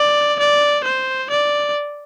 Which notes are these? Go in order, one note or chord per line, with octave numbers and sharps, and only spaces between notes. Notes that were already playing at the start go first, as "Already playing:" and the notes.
Already playing: D5
D5
C5
D5